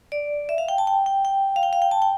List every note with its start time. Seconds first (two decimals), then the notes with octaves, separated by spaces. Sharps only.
0.12 D5
0.49 E5
0.58 F5
0.69 G5
0.78 A5
0.87 G5
1.06 G5
1.25 G5
1.56 F5
1.63 G5
1.73 F5
1.82 G5
1.91 A5
2.02 G5